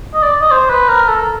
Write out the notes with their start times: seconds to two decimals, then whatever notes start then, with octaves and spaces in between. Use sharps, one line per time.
0.14 D#5
0.23 D5
0.42 D#5
0.51 C5
0.70 B4
0.89 A#4
1.08 A4